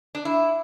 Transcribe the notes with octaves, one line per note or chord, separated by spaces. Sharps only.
D4
E4